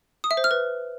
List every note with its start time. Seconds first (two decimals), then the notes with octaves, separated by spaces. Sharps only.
0.24 D#6
0.31 E5
0.37 C5
0.44 F6
0.51 B4